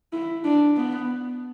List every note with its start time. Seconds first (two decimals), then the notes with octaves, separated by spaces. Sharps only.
0.13 E4
0.44 D4
0.77 B3